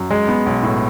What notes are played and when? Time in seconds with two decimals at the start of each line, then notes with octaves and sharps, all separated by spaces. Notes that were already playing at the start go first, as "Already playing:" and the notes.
Already playing: F#2
0.11 G#3
0.28 B3
0.46 B1
0.63 A2